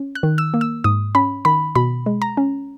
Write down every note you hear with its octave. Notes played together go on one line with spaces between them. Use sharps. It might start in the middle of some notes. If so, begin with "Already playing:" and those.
Already playing: C#4
F#6
D#3
E6
A#3
E6
G#2 D#6
C#4 B5
D#3 B5
B2 B5
G#3
A#5
C#4